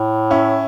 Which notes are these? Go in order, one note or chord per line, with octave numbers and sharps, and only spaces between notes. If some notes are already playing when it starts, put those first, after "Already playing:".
Already playing: A2
C#4 E4